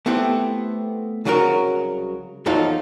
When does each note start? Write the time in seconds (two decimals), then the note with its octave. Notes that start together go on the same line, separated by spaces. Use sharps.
0.06 A3 B3 C4 E4 G4 A4
1.25 C2 C#3 F#3 F#4 A4 A#4
2.46 E2 F3 F#3 D#4 F4 A4